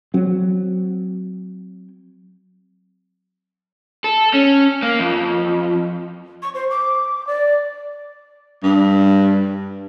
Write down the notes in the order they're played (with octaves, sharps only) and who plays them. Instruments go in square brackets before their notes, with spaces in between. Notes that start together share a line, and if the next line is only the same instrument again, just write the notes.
[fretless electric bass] F#3 C4
[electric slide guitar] A4
C#4
A#3
F2
[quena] C#6
C5
D6
D5
[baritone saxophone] G2